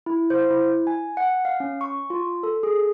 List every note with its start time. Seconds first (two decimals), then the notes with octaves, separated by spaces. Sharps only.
0.06 E4
0.30 C5
0.50 E4
0.87 G#5
1.17 F#5
1.45 F5
1.60 C#4
1.81 C#6
2.10 F4
2.43 A4
2.63 G#4